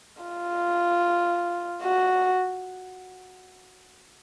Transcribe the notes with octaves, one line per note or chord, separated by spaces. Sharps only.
F4
F#4